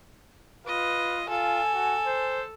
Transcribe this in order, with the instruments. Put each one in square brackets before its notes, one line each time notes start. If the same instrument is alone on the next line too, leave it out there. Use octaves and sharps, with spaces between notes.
[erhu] F4 [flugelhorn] B4 [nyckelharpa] D#5
[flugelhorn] F4 [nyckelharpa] A4 [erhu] G#5
[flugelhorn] F#4
C5